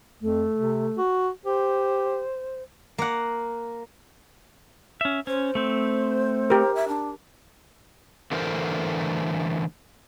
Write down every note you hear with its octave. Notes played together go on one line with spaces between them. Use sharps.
F2 A3
C3
F#4
G4 C5
A#3 F#5
C#4 E5
C#4 C5
A3 C4
G4 A#4
E5
D4
D3 E3 A3 A#4 C5